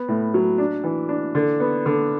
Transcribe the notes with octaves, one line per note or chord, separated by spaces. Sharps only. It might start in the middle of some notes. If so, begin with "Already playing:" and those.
Already playing: B3
A2
F#3
D4
E3
D4
D3
B3
D3